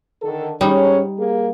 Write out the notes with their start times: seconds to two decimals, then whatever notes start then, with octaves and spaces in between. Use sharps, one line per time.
0.22 D3 D#3 A4
0.61 G#2 G3 C#4 D#4 C#5
1.18 A#3 G#4